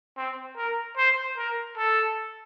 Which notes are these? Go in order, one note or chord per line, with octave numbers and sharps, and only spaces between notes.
C4
A#4
C5
A#4
A4